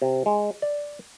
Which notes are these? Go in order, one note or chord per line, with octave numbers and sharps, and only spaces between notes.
C3
G#3
D5